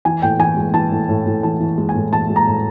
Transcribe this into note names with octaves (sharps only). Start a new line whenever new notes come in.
E3 G#5
A2 G5
E3 G#5
G#3
E3 A5
A2
A2
A2
E3 A5
E3
G#3
G#5
A2
E3 A5
G#3
A#5
A2